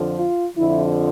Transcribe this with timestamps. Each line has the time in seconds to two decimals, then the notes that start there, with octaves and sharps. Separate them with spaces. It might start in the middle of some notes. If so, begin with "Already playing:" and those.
Already playing: F2 D3 F3
0.18 F4
0.57 F2 D3 F3 E4